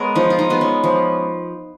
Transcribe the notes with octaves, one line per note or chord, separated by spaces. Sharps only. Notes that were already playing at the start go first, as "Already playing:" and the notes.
Already playing: G#3 B3 G#4 A#4 C#5
F3 D#4
F4
D#4
G#3 B3
C#4
F3